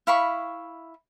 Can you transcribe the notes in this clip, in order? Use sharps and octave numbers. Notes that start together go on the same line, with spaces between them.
E4 F5 B5 C#6